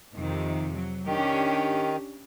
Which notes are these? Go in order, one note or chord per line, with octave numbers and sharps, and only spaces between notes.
F2 C3 D#3
F#3
D#3 C#4 D4 G4